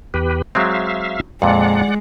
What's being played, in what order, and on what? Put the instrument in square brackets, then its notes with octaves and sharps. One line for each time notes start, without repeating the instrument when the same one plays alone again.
[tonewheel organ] E2 G4 B4
[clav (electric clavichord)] F#3 G#3 C4 [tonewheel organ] E5 F5
[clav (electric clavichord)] F2 A#2 [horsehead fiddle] G#3 [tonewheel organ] D5 F#5